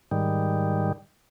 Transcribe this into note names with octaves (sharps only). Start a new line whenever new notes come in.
G#2 D#3 G3